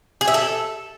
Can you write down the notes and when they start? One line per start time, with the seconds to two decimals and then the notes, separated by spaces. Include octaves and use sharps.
0.21 G#4
0.28 E5
0.34 A4